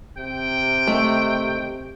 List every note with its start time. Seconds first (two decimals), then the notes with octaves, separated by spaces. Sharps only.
0.18 C3 G5
0.87 D#3 A3